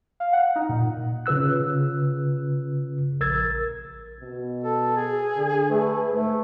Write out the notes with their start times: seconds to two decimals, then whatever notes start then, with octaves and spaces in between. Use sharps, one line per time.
0.20 F5
0.33 F#5
0.56 D#4
0.69 A#2
1.26 C#3 F4 B4 E6 F#6
3.20 A#1 A#4 E6 G#6 A6
4.20 B2
4.64 A4
4.97 G#4
5.36 D3
5.71 A3 B4
6.11 G#2 A3